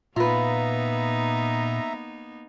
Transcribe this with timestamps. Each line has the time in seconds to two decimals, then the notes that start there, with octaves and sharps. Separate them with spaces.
0.16 A#2 A#3 B3 D#4 F4 B4 E5 A#5